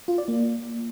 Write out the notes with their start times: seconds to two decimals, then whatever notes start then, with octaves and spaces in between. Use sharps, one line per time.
0.08 F4
0.18 D5
0.28 A#3